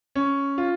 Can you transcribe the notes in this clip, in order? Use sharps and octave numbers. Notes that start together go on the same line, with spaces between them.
C#4
F4